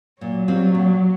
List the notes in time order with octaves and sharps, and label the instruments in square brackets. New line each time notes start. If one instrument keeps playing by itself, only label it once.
[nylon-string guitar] A#2 [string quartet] F#3
[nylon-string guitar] G3 C4 F4
A#2